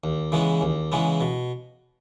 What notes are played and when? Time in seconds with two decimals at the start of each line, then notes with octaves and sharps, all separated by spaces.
0.04 D#2
0.32 C#3 E3 G#3 B3
0.61 D#2
0.92 C#3 E3 G#3 B3
1.21 B2